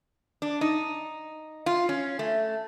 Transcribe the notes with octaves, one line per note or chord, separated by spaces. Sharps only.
D4
D#4
F4
C#4
A3